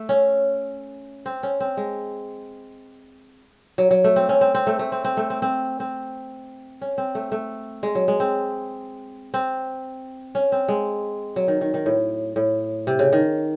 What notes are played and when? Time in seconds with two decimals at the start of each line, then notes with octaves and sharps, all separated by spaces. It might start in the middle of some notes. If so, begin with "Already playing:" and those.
Already playing: A3
0.09 C#4
1.26 C4
1.43 C#4
1.60 C4
1.77 G#3
3.78 F#3
3.91 F#3
4.04 A3
4.16 C4
4.29 C#4
4.41 C4
4.55 C4
4.67 A3
4.79 A3
4.92 C4
5.05 C4
5.17 A3
5.30 C4
5.42 C4
5.80 C4
6.81 C#4
6.98 C4
7.15 A3
7.32 A3
7.83 G#3
7.95 F#3
8.08 G#3
8.20 C4
9.34 C4
10.35 C#4
10.52 C4
10.68 G#3
11.36 F#3
11.48 D#3
11.61 D#3
11.74 D#3
11.86 A2
12.36 A2
12.87 C3
12.99 C#3
13.13 D#3